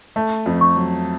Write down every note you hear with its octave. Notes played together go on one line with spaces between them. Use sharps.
A3
F2
C#6
F#3